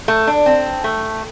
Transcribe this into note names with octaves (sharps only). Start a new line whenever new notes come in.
A3
D4
C4
A3